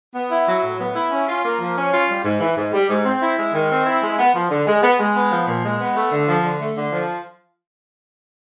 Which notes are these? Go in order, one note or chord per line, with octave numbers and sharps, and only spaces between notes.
B3
E4
F#3
A2
B3
E4
C#4
F4
A#3
F3
C#4
F4
G3
G#2
E3
G#2
G3
G#2
C4
E4
G#3
D#3
C4
E4
G#3
B3
F3
D3
G#3
B3
G#3
B3
F3
A#2
G#3
B3
A3
D3
F3
D3
A3
D3
F3